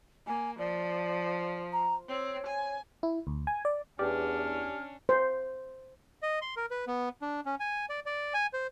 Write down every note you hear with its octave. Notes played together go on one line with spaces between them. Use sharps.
A#3 G#5
F3 D5
A#5
C4 C#5
G#5
E4
D2
G#5
D5
E2 C#4 D4 G4 D5 F6
C5
D#5
C6
A#4
B4
B3
D4
C#4
G#5
D5
D5
G#5
C5